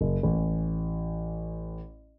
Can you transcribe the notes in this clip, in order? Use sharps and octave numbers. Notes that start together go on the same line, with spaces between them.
F#1
A1